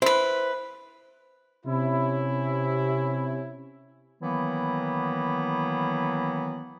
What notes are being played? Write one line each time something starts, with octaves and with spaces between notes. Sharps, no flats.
E4 B4 C5
C3 C#4 E4
D#3 E3 F#3 A#3 B3 E4